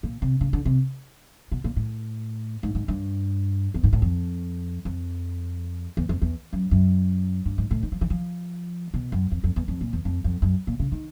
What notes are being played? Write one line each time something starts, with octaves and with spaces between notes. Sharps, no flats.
A#2
C3
C#3
D3
C3
B2
A#2
A2
G#2
G#2
G2
E2
G#2
A2
F2
F2
E2
F2
E2
F#2
F#2
G2
G#2
A2
D#3
F3
E3
F3
B2
F#2
F2
F2
E2
F2
A#2
E2
F2
F2
F#2
A#2
C#3
D#3